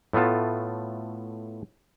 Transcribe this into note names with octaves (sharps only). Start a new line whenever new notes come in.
A2 A3 B3 F4 A5